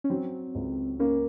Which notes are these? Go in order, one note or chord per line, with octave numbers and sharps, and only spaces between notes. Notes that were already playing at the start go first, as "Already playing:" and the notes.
C#4
F#3 C4
C#2
A#3 C#4